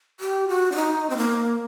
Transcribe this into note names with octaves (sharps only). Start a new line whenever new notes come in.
G4
F#4
D4
D#4
C4
A#3